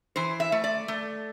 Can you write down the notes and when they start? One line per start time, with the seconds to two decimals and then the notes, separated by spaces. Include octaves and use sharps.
0.16 E3 C5
0.40 E5
0.52 A3
0.64 D5
0.88 A3